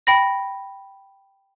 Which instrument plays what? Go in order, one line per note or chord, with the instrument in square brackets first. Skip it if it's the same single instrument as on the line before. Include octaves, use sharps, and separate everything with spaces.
[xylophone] G5 B5 A#6